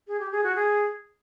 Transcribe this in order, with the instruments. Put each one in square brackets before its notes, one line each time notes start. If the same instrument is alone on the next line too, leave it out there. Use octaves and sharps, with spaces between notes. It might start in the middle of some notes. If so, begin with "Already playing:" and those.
[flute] G#4
G4
G#4
F#4
G#4